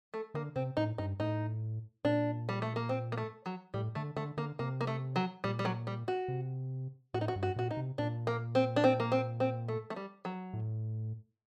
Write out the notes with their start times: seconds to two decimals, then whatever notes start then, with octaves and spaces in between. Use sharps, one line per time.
0.14 A3
0.34 D3 A#3
0.56 C3 C4
0.77 A2 D#4
0.98 G2 D#4
1.20 A2 D#4
2.05 A#2 D4
2.49 G3
2.62 A3
2.76 A#3
2.89 C4
3.12 A#3
3.18 A3
3.46 F#3
3.74 A2 G3
3.95 D3 A3
4.16 D3 A3
4.37 D3 A#3
4.59 C3 A#3
4.81 A#3
4.87 A3
5.16 F#3
5.44 A#2 G3
5.59 G3
5.65 F#3
5.87 G3
6.08 F#4
6.28 C3
7.14 A2 F#4
7.21 D#4
7.28 F#4
7.36 G2
7.43 F#4
7.56 A#2 F#4
7.71 D#4
7.77 C3
7.98 A#2 D4
8.27 A#3
8.55 C4
8.76 D4
8.84 C4
9.00 A#3
9.12 C4
9.40 C4
9.68 A3
9.90 A3
9.96 G3
10.25 F#3
10.53 A2